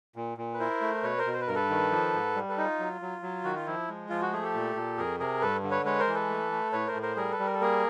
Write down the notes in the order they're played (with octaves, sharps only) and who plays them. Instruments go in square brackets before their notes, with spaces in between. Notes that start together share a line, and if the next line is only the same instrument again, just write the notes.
[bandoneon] A#2
A#2
[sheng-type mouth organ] B4
[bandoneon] E4 [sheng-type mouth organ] A#4 C5
[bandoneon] A3
[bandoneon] B2 [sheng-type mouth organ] B4 C#5
[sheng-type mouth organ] A#4 C5
[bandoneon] B2
[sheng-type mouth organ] C5
B4
[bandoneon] G2 [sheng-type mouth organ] A#4
[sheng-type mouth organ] A4 B4
[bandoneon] D#3
F3
G#2
G3
[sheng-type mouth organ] A4 B4
[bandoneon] D#4
[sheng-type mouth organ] F4
[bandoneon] F#3
F#3
F#3
[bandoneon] D#3 [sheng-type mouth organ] F#4
[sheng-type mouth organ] F4
[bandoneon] F3 [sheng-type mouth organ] E4
[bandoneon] G#3
[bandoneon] F3 [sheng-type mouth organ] F4
[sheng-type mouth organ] F#4
[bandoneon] A3 [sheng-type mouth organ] G#4
[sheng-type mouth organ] G4 A4
[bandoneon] A#2
A#2
[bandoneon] F2 [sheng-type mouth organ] G#4 A#4
[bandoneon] C3 [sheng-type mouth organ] G#4 A#4
[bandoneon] G2 [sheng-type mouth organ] A4 B4
[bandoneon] D3
[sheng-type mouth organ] B4 C#5
[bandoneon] G#3 [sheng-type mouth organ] B4 C#5
[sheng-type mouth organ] A#4 C5
[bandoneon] E3
[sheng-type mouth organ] A4 B4
[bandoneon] A3
A3
[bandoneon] A2 [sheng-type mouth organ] B4 C#5
[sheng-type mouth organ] A#4 C5
[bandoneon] A2
[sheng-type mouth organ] A#4 C5
[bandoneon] G3 [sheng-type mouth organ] G#4 A#4
[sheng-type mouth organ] A4 B4
[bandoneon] G3
[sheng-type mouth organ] A#4
A4
[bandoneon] A#3 [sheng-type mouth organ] G#4 A#4